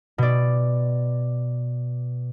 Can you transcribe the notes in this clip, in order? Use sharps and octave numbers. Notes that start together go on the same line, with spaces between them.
B2 D5